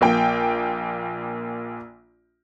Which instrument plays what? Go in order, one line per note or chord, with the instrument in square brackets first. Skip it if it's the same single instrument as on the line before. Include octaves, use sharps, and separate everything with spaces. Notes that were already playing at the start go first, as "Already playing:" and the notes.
[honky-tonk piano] A#1 A#3 G5